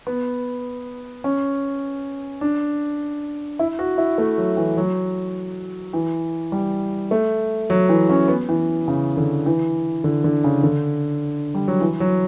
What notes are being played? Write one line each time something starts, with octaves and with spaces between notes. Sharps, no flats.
B3
C#4
D4
E4
F#4
E4
A3
F#3
E3
F#3
E3
G3
A3
F#3
E3
C#4
B3
E3
C#3
D3
E3
D3
D3
C#3
D3
G3
F#3
E3
F#3